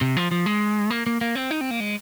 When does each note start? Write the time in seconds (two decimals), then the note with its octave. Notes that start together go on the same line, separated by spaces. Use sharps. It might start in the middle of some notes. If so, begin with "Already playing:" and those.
0.01 C3
0.17 F3
0.31 F3
0.46 G#3
0.90 A#3
1.07 A#3
1.21 A#3
1.35 C4
1.51 D#4
1.61 C4
1.71 A#3
1.80 G#3